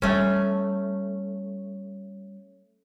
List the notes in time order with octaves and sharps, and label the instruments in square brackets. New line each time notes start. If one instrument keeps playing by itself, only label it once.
[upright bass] G3 [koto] A3 C#4